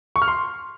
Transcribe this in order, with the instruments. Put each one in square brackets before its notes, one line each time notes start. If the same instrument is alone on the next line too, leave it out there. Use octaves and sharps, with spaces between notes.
[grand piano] C#6
F6
C6